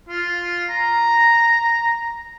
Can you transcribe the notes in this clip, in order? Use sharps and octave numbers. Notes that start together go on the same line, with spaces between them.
F4
A#5